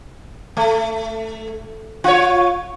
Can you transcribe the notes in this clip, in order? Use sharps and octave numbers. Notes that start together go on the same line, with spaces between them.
A3
F4 C#5